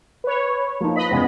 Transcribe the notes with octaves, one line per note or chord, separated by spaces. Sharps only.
B4 C#5
F3 A#3 D#4
B4 D#5 B5
E2 C#3 G#3 B3